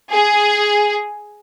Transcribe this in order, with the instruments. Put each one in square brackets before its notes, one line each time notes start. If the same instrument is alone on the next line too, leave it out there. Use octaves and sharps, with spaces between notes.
[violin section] G#4